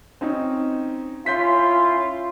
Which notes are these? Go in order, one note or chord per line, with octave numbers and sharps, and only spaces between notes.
C4 C#4 D#4
C#4 E4 F4 C6 G6 B6